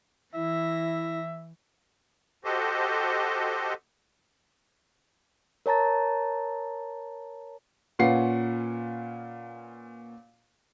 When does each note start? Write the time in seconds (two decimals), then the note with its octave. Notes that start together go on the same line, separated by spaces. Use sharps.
0.34 E3 E4 E5 A#6
2.45 F#4 G4 A4 C5 D#5
5.66 A#4 C#5 A5 A#5 A6
7.99 A#2 C#4 F4 B4 F#5 C7